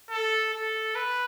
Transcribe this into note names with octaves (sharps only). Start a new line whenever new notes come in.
A4
A4
B4